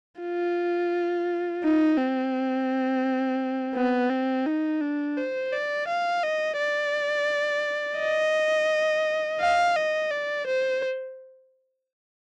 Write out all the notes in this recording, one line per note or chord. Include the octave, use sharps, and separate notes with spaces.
F4
D#4
C4
B3
C4
D#4
D4
C5
D5
F5
D#5
D5
D#5
F5
D#5
D5
C5